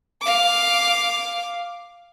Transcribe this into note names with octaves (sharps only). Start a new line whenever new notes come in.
F5 D6